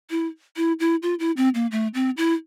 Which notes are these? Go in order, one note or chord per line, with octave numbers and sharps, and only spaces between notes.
E4
E4
E4
F4
E4
C4
A#3
A3
C4
E4